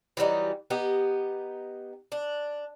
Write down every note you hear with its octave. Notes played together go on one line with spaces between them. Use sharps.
E3 F#3 G3 D#4
B3 D#4 G4
D4